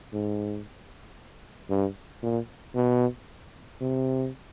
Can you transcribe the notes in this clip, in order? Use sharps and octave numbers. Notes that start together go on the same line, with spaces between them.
G#2
G2
A#2
B2
C3